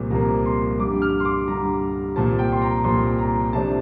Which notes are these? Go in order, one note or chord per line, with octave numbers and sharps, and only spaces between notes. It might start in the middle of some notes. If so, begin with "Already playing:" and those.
Already playing: C2 A#2 F3 A#3
C2 A#2 F3 A#3 A#5
C6
G2 D3 G3 D6
F6
C6
D6
G2 D3 G3 A#5
C2 A#2 F3 A5
G5
C6
A#5
C2 A#2 F3 C6
A#5
C3 F3 A3 D4 A5